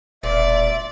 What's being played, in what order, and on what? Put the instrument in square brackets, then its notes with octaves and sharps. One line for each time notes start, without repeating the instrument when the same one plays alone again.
[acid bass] E1 [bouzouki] A#2 [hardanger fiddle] D5 [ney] E5